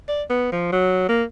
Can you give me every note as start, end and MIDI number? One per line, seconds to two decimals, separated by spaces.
0.08 0.23 74
0.30 0.48 59
0.52 0.69 53
0.72 1.04 54
1.08 1.23 58